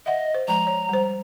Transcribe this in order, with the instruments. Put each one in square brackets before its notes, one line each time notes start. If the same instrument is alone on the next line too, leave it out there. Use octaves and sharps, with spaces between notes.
[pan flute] D#5 [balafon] E5 F#5
[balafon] C5
[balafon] F3 G#3 [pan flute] A#5
[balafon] C#5
G3 C5